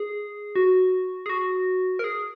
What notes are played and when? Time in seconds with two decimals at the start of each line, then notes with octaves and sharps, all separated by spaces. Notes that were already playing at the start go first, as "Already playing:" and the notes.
Already playing: G#4
0.56 F#4
1.26 G#4
1.29 F#4
1.99 A#4
2.04 G#4